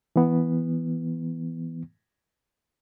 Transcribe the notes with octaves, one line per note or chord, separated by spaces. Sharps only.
E3 B3